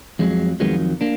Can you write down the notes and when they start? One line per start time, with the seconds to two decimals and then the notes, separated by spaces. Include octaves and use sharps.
0.19 F2 D#3 F#3 G#3
0.60 F2 D#3 F#3 G#3 B3
1.01 A#3 D4